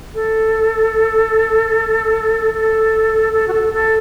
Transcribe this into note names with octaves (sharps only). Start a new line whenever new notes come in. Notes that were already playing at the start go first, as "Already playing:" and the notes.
A4
A4
A4
F#4
A4
A4